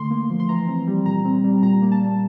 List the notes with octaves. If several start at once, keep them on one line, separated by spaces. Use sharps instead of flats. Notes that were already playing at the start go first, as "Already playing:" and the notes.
Already playing: D3 A3 C6
A#3
F3
C6
E3 A#5
C4
G3
A#2 A#5
C4
G3
A#2 A#5
A#3
A5
G3